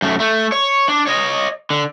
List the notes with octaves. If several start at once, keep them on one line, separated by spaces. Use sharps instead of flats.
F#2 A3
A3
C#5
D4
C#5 D#5
D3